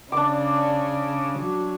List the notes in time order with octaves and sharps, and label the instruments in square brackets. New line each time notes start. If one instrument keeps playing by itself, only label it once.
[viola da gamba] C#3 [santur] D4 D6 [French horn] D5
[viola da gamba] F#3